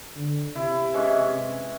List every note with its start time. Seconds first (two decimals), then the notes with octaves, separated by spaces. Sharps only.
0.17 D3
0.55 C3 E4
0.94 E3 G#3 C#4
1.31 C#4